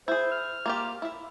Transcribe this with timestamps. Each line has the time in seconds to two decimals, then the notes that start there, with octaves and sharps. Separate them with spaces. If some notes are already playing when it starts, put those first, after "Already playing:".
0.08 E4 G#4 C5
0.32 F6
0.66 A#3 F4 G4
1.02 E4 E5